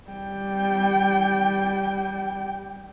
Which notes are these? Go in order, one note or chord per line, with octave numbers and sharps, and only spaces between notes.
G3 G5